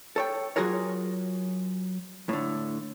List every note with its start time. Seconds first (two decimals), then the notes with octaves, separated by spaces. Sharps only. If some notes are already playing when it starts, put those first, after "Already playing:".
0.16 A4 C#5 G5
0.56 F#3 F4 F#4 G#4 A#4 C#5
2.29 A2 D3